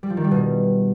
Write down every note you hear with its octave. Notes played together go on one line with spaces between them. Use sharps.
G3
F3
D#3
G3
B2